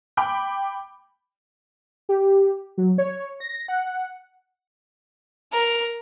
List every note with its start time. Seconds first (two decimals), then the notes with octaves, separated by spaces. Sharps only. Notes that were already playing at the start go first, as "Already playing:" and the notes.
0.17 G5 B5 D6
2.09 G4
2.78 F#3
2.98 C#5
3.40 A#6
3.68 F#5
5.53 A#4